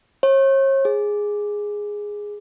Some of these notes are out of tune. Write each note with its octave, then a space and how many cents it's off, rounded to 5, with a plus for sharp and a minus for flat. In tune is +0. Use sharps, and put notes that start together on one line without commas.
C#5 -40
G#4 -5